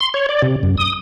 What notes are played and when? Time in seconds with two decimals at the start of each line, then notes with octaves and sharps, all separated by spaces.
0.01 C6
0.14 C#5
0.29 D5
0.42 C3
0.63 F#2
0.77 D#6